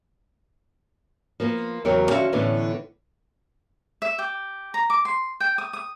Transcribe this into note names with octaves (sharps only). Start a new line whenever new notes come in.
F3 A#3 B3
E2 C#3 F#3 G4 A#4 C#5
D3 F3 C#4 F#4 E5 F5
A2 D3 E3 B3 C#4
E5
G4
A#5
D6
C6
G5
D#6
D#6